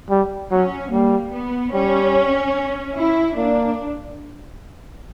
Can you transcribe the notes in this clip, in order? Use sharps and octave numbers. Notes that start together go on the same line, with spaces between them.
G3
F#3 C#4
G3 A#3
B3
G3 C#4
E4
A#3 D4